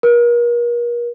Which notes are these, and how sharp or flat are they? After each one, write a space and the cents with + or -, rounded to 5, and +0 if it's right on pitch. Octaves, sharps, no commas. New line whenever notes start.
A#4 +40